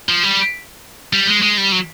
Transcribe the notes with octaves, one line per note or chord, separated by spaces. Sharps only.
F3
G3
G3
G#3
G#3
G3
F#3